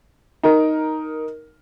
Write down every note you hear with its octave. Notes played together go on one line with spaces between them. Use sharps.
D#4 A#4